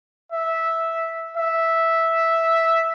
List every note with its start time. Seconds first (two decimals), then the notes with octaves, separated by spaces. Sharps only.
0.32 E5
1.37 E5